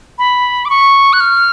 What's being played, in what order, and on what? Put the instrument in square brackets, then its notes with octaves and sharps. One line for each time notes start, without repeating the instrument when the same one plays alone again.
[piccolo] B5
D6
C#6
F#6
F6